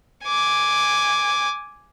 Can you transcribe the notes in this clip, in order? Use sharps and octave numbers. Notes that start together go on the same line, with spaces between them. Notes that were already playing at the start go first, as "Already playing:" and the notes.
G#5 D6